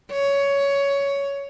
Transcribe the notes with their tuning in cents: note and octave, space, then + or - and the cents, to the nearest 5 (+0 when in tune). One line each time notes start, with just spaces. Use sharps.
C#5 +15